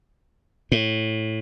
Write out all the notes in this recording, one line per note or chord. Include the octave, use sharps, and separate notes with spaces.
A2